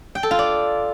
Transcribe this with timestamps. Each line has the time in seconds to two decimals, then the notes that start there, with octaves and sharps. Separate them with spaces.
0.15 G5
0.23 A4
0.31 F4
0.39 D5